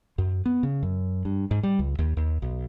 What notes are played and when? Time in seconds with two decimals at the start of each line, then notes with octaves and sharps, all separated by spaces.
0.18 F#2
0.46 B3
0.63 C#3
0.83 F#2
1.25 G2
1.51 G#2
1.63 G3
1.79 C#2
1.99 D#2
2.17 D#2
2.42 B1